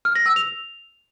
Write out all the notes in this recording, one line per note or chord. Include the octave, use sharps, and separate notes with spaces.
F6
A#6
E6
F7